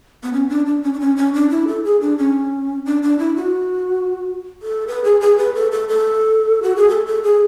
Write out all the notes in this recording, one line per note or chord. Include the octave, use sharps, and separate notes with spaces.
B3
C#4
D4
D4
C#4
D4
C#4
C#4
D4
E4
A4
G#4
D4
C#4
D4
D4
E4
F#4
A4
B4
G#4
G#4
B4
A4
A4
A4
F#4
G#4
A4
A4
G#4